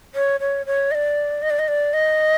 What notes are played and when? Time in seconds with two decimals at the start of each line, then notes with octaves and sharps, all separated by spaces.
0.15 C#5
0.40 C#5
0.66 C#5
0.91 D#5
0.95 D5
1.42 D#5
1.50 D5
1.59 D#5
1.68 D5
1.93 D#5